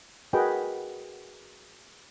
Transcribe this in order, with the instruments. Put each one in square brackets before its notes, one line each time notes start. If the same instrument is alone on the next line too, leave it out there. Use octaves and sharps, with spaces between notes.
[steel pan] F#4 G#4 A#4 B4 D#5 G5